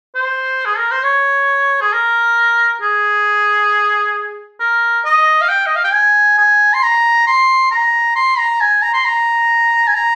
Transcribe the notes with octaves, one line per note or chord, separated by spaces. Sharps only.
C5
G#4
A#4
C5
C#5
G#4
A#4
G#4
A#4
D#5
F5
G5
D#5
F5
G5
G#5
G#5
C6
A#5
C6
A#5
C6
A#5
G#5
A#5
C6
A#5
G#5
A#5